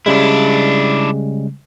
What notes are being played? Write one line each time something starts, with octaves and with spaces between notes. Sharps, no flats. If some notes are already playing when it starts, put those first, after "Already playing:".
C#3 G3 G#3 D4 E4